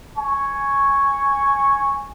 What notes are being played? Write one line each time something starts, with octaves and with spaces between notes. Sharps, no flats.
G#5 C#6